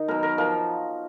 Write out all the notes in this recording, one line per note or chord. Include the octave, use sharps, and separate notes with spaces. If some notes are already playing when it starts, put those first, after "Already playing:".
Already playing: D#3 D#4
B2 F#3 A#4
A#4
F3 A#4